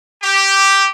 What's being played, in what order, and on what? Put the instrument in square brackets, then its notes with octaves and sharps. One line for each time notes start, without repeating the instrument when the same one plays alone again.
[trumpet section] G4